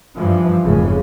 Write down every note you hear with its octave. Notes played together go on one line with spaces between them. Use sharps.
G2 E3 F3
F1 G#2 C#3